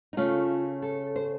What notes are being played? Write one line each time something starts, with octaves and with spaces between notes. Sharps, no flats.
D#4
C#3 A3 C#4 F4
A4
C5